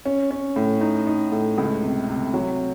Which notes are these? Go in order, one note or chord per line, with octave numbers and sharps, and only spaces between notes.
C#4
C#4
A2
D#4
D#4
A2
C#2
C3
C3
F#3